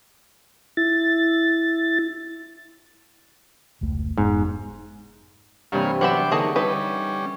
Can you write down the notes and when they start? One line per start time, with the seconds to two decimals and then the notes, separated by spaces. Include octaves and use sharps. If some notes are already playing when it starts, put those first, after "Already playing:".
0.77 E4 A6
3.81 F1 C#2 A3
4.18 F1 G#2 B3
5.72 G2 C3 E3 A#3 C#5 F5
6.01 F#3 B3 C5 E5 F#5 G5 B5 D6
6.31 D3 A#3 D#4 G#4 A5 C#6
6.56 G3 C#4 D#4 E4 B4